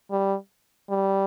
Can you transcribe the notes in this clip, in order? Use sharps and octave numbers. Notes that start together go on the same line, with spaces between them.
G3
G3